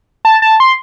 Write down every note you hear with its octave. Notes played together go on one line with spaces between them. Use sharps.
A5
A5
C6